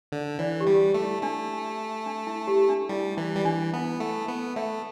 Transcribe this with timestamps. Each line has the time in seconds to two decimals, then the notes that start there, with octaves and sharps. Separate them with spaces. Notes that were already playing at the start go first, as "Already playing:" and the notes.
0.12 D3
0.39 E3 D5
0.61 G4
0.67 G3
0.81 G4
0.95 A3
1.02 E4
1.23 A3 D4
2.06 D4
2.27 E4
2.47 G4
2.69 D4
2.89 G3 E4
3.17 E3 E4
3.36 G3
3.45 E3 D4
3.73 B3 E4
4.00 A3
4.28 B3
4.56 A3 E5